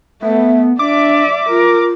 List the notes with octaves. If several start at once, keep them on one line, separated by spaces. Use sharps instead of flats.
A3 B3 E5
D4 D5 E5 D6
F4 A#4